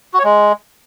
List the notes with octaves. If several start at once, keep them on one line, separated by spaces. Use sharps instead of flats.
F#4
C#5
G#3